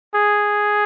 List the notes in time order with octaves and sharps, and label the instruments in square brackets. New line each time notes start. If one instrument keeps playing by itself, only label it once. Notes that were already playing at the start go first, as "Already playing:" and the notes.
[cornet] G#4